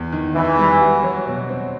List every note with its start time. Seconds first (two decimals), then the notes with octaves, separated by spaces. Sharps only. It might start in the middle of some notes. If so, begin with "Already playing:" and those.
Already playing: E2
0.13 D#3
0.35 E2 E3
0.59 G3
0.81 F#4
1.03 F#3
1.27 B2
1.49 C4